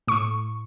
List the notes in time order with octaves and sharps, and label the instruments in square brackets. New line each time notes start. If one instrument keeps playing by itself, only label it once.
[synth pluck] A2 C#6